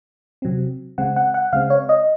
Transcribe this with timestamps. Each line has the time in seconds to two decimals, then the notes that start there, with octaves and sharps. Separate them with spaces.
0.42 C3 F#3 C4
0.98 C#3 G#3 C4 F#5
1.16 F#5
1.34 F#5
1.53 C#3 G#3 C4 F5
1.70 C#5
1.89 D#5